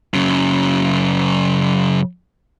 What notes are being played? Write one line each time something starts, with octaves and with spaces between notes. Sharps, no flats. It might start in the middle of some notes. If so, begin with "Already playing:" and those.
F#2 C#3